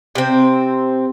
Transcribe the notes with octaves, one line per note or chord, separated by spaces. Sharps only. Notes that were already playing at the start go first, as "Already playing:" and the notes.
C3 C4